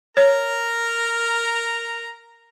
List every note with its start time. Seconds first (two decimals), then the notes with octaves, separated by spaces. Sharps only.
0.17 A#4 C#5 A#5